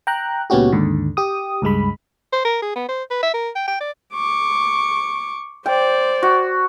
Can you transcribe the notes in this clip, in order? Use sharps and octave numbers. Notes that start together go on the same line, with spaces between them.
G5 A#5 F#6
C#2 A#2 B3 C#4 F#4 G4
D#2 G#2 D3
G4 D#6
C#2 G2 G#3 B5
C5
A#4
G#4
B3
C5
B4
E5
A#4
G5
G5
D5
C#6 D6
C5 D5 G5
F#4